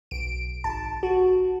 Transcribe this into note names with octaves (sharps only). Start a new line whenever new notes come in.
B1 D7
G#1 A5
F#4